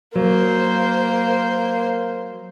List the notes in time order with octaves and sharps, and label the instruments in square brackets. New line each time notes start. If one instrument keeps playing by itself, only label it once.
[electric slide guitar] F#3 [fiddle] A#3 C5